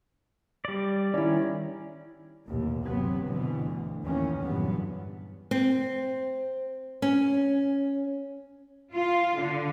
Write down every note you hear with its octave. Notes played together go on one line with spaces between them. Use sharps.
G3 D5
D#3 C#4 E4 D5
A1 D#2 B2
G1 C3 F#3 B3 C4
B2 D3 E3
D2
D#2 A2 D#3 E3 C#4
E2 G2 A#2 D3 F#3 B3
C4
C#4
F4
D3